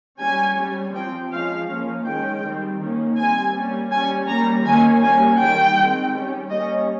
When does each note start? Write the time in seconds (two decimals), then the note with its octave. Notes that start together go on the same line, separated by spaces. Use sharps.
0.20 G3 C#4 G#5
0.57 G3 C#4
0.93 F3 C4 G5
1.31 F3 G#3 C#4 F5
1.69 F3 A#3 C#4
2.05 D#3 G#3 C#4 G5
2.43 D#3 G3 C4
2.79 D#3 A#3 C#4
3.17 G3 C4 G#5
3.54 G3 A#3 C#4
3.91 G3 C#4 G#5
4.28 G3 A#3 C#4 A#5
4.65 D#3 A#3 C#4 G#5
5.02 G3 A#3 C#4 G#5
5.39 D#3 G3 A#3 G5
5.78 D#3 G#3 C4
6.14 G3 C#4
6.51 G3 A#3 C#4 D#5